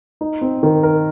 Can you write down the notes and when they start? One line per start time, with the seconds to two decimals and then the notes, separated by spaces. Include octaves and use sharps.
0.21 D#4
0.42 C4
0.63 D#3
0.83 A#4